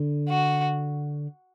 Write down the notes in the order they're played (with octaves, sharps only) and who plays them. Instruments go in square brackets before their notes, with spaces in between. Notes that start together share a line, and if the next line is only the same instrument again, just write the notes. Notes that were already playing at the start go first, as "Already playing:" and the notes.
Already playing: [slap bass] D3
[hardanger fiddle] F#4